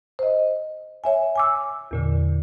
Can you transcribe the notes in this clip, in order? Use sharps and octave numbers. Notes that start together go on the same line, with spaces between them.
C5 D#5
C#5 E5 G#5
G#5 D6 E6
E2 A#2 D3